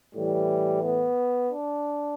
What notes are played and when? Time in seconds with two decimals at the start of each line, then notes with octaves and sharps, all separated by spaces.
0.15 A2 E3 G3
0.82 B3
1.49 D4